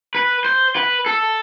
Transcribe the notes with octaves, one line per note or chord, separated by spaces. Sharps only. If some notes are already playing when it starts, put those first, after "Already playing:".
B4
C5
B4
A4